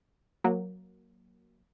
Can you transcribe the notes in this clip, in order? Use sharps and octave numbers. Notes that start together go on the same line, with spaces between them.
F#3 A#3